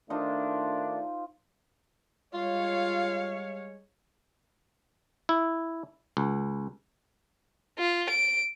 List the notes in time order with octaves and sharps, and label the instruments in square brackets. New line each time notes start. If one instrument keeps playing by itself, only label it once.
[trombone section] D#3 A3 D4 [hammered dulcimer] D#4 F4 C5
[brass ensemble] G3 G#3 C#5 [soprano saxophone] F4 [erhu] F5
[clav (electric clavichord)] E4
C#2
[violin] F4
D7